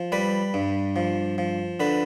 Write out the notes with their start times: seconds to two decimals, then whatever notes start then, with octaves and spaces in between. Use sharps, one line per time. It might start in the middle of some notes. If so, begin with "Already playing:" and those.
Already playing: F3
0.12 G3 B4
0.54 G2
0.96 F3
1.38 F3
1.80 D3 B4